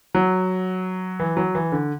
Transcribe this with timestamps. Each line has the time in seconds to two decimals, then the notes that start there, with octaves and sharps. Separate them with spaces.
0.15 F#3
1.20 E3
1.37 F#3
1.55 E3
1.72 D3